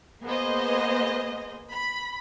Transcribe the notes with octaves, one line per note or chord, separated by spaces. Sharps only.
A#3 B3 G#4 C5 D#5
B5